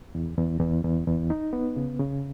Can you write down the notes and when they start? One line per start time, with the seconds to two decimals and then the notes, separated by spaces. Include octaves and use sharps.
0.15 E2
0.37 E2
0.60 E2
0.84 E2
1.07 E2
1.30 D#4
1.53 B3
1.76 C#3
2.00 C#3